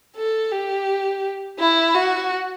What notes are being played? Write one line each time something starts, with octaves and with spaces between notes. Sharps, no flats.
A4
G4
E4
F#4